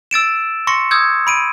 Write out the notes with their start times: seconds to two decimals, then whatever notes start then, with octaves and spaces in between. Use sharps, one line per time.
0.11 E6 A6 D7 E7
0.67 C6 C#6 A#6 C#7
0.91 D#6 E6 G6 G#6
1.27 B5 D7 D#7